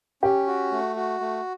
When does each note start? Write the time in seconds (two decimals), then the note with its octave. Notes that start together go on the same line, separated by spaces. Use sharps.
0.23 C#4 G4
0.47 F#4
0.71 A3
0.96 F#4
1.20 A3